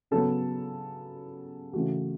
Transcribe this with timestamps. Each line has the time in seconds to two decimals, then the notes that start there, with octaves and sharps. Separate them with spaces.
0.11 C#3 F#3 B3 A4
1.73 C#3 E3 A3 F#4